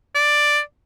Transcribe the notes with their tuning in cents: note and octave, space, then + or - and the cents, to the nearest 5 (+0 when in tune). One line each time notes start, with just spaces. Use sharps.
D5 +5